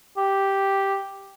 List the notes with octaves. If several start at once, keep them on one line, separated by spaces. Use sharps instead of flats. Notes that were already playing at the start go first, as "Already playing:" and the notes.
G4